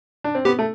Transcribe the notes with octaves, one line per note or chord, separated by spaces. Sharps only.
D4
C4
B3 G4
A3